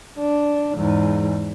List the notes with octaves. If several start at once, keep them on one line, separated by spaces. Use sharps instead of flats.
D4
E2 G#2